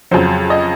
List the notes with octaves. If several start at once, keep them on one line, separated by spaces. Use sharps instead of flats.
F2 C#3 F#3 C5
D#5